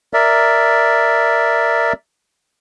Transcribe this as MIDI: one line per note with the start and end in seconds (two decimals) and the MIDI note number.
0.14 1.93 70
0.14 1.93 74
0.14 1.93 76